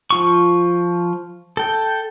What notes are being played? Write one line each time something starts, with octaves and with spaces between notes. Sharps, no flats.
F3 F4 C#6
A4 G5